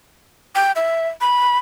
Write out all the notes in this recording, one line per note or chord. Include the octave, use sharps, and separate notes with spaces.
G5
E5
B5